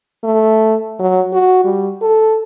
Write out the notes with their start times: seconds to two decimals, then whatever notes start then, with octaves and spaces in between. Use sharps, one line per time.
0.24 A3
0.99 F#3
1.33 F#4
1.64 G3
2.02 A4